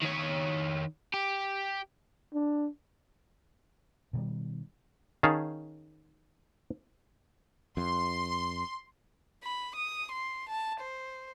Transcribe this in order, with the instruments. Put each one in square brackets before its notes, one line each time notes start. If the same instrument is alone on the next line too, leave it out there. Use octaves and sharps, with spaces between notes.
[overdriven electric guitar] D#3 C#5
G4
[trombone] D4
[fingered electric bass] B2 D#3 G3
[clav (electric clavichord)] D#3 C#4 G#4 F5 A5
[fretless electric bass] F2 [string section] C6
[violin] B5
D#6
C6
A5
C5